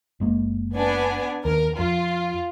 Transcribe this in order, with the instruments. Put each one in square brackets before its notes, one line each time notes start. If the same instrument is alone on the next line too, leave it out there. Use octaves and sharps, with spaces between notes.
[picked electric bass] F#1 G#3 A#3
[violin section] B3 D4 G#5
[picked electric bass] D#2 [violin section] A#4
[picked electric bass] F2 [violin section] F4